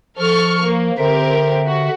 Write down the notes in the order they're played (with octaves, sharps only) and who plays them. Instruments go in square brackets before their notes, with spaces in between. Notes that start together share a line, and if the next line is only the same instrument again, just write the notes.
[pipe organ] F3 [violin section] A4 C#6 F6
[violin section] A#3
[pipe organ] D3 E5 [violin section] C4 G4 A#4
[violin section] F#4